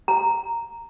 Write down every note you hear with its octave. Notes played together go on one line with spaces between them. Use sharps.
A#5